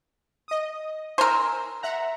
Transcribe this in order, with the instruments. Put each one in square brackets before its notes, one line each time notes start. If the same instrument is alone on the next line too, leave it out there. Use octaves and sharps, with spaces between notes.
[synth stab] D#5 D#6
[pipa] A#4 C5 [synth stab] G#5 A#5 E6
[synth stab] E5 F#5 A#5